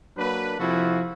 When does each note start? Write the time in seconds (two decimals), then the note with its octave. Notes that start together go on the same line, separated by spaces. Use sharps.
0.18 F#3 A#3 D4 B4
0.60 C3 F3 E4 F#4 G#4 A4